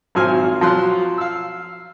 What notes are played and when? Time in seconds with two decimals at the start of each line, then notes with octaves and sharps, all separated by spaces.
0.15 G#1 F3 F#3 C5 G#5 F6
0.61 F3 F#3 C6 F#6
1.18 F5 E6